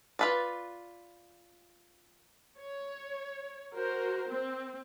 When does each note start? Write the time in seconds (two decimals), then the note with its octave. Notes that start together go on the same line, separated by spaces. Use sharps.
0.19 F4 B4 D5
2.59 C#5
3.75 F#4 A#4 C5
4.29 C4